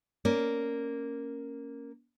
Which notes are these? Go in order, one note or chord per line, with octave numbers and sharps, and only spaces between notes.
A#3 C#4 D5